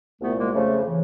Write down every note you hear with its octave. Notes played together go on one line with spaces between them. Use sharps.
C2 A#2 F3 A3 B3
G#3 A#3
F2 C#3 F3 A3
C#3 E3